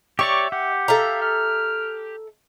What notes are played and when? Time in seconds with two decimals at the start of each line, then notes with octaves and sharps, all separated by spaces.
0.19 G4 C#5 D5 E5 C#6
0.52 G4 F#5
0.88 A4 E5 F5 A#5
1.21 F6